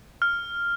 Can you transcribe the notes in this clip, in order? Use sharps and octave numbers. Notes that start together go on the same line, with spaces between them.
F6